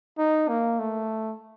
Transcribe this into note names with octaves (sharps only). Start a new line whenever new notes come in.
D#4
A#3
A3